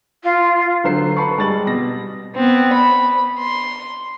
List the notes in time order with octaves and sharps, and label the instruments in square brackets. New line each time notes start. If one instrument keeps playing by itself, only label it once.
[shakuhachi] F4
[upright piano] D3 F#3 C5 C7
B4 A5 B5 C#6
G3 G#3 A6 F#7
B2 A#6
[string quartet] B3 C4
B5
C6